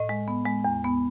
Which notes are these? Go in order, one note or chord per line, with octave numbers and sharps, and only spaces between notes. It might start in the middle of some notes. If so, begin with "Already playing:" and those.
Already playing: A2 D#5
G#3
B3
G#3
E2
B3